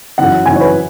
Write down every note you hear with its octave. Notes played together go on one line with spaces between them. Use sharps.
F#2 E3 F#5
F#2 E3 G#5
C#5
B4